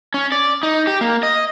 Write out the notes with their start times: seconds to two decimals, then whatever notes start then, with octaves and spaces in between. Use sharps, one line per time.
0.14 C#4
0.32 D5
0.63 D#4
0.87 G4
1.01 A#3
1.23 D#5